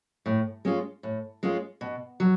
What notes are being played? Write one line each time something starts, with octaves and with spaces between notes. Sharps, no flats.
A2
G#3 C#4 F4
A2
G#3 C#4 F4
B2
F#3